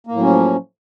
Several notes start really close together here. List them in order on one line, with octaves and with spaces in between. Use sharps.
A#3 A2 F#3 C#4 F3